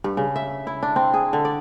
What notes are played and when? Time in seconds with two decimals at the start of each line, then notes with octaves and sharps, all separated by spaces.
0.04 G2
0.17 C#3
0.36 E5
0.67 E4
0.83 D4
0.96 C4
1.14 G#4
1.33 D3
1.45 D5